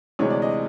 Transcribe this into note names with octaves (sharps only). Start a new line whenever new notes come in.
D2 C3 E3 G#3 C#5
D5
D#5